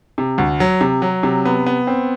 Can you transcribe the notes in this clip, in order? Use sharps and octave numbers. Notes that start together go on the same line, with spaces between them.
C3
D2
F#3
C3
F#3
C3
B3
B3
C4